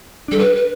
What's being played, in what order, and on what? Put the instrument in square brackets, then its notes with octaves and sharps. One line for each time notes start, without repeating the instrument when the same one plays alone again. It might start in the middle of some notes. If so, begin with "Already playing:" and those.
[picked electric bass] G3 D4 [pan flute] A4
[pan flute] B4
B4